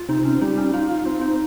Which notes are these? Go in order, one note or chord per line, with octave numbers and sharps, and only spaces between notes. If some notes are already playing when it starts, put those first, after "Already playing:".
Already playing: F4
C3 D#4
C#4
G3 D#4
C#4
D#4 F4
C4 D#4
D#4